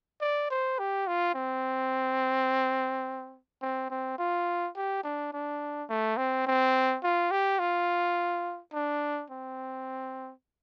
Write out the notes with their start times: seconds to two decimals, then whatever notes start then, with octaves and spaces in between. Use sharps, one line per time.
0.21 D5
0.50 C5
0.79 G4
1.07 F4
1.34 C4
3.61 C4
3.90 C4
4.18 F4
4.76 G4
5.03 D4
5.33 D4
5.89 A3
6.17 C4
6.46 C4
7.03 F4
7.31 G4
7.59 F4
8.74 D4
9.30 C4